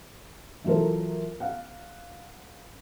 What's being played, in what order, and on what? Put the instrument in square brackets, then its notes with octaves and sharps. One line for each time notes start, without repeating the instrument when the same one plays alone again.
[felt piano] E3 F#3 F4 A4 A#4
F5 F#5